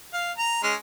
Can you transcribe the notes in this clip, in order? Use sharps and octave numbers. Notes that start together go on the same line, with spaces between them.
F5
A#5
G#3 C#4